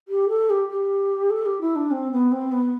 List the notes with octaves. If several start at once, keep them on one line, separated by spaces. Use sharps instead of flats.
G4
A4
G4
G4
A4
G4
E4
D4
C4
B3
C4
B3